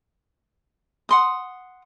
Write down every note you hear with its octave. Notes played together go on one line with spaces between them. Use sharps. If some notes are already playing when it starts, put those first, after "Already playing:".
F#5 C6 D#6